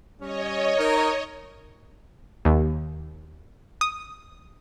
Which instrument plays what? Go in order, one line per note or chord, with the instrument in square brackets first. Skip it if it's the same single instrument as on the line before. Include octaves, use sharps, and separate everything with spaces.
[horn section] G3 C#4 [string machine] C#5 D#5
[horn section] D#4 A#4
[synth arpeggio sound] D#2
D#6